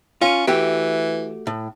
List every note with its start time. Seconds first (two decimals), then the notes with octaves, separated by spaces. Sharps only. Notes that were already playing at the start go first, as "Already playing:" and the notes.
0.21 C#4 F4
0.47 E3 A3 F#4 G4
1.47 A2